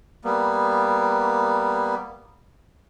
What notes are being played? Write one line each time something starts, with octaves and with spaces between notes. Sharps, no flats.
G3 A#3 B3